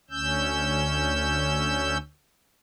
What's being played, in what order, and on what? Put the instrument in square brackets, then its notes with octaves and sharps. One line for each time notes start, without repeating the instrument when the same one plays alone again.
[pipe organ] D2 C#4 E6 G6